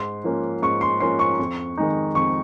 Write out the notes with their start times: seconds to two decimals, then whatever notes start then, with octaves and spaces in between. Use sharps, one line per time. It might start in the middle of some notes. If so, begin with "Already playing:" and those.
Already playing: G#2 C6
0.24 F3 A#3 C#4
0.62 G#2 C#6
0.81 C6
1.00 F3 A#3 C#4 C6
1.19 C#6
1.39 F2
1.77 D#3 G#3 D#4
2.15 F2 C#6